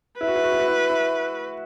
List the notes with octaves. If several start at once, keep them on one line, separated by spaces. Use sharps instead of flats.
E4 B4
F#4
E4
F#4
E4
F#4
E4
E4